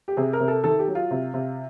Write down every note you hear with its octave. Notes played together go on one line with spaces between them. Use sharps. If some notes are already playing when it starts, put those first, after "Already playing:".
G4
C3 G#4
A#4
C3
A4
D#3 A4
G4
F#3
F4
C3
C3